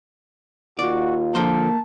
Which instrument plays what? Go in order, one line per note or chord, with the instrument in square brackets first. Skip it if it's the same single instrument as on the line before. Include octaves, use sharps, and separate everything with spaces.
[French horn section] D#2 F4 [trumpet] F#4 [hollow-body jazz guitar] D5
[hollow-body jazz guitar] D3 F3 C5 [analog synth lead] A#3 [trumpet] A5